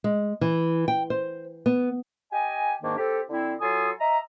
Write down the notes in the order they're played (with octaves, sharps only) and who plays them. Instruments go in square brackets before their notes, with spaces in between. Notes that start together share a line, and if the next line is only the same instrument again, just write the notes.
[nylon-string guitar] G#3
E3
G5
C5
B3
[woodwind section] G4 D#5 G#5
G#2 D#3 A#3 D4
C4 G4 A4
D3 C4 E4
F#3 F4 A4 G#5 D#6
D#5 E5 A#5